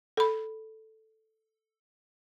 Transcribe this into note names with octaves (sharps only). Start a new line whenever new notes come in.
A4 B5